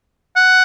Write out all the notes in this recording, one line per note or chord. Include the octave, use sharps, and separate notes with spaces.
F#5